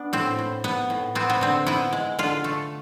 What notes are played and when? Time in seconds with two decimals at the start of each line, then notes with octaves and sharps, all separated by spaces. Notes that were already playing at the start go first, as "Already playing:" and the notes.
Already playing: B3 D4
0.13 A2 C4
0.39 A2
0.64 B3
0.90 A2
1.15 B3 C4
1.30 B3
1.41 D3 C4
1.67 B3 E4
1.93 G#3
2.19 D3 F4
2.44 A3